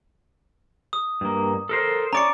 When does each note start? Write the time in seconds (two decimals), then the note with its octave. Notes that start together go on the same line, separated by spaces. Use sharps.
0.93 D#6
1.21 G2 A#3
1.69 A4 A#4 C5
2.13 C#4 D5 A#5 D6 C#7